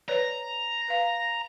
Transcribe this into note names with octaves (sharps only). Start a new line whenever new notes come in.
B4 C#5 D5 A#5
B4 F5